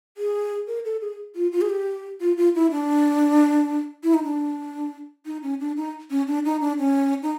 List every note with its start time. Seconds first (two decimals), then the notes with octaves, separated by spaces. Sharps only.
0.17 G#4
0.68 A#4
0.85 A4
1.01 G#4
1.35 F4
1.52 F4
1.61 G#4
1.69 G4
2.20 F4
2.37 F4
2.55 E4
2.71 D4
4.03 E4
4.14 D#4
4.24 D4
5.26 D#4
5.43 C#4
5.60 D4
5.77 D#4
6.10 C#4
6.27 D4
6.45 D#4
6.61 D4
6.78 C#4
7.22 D#4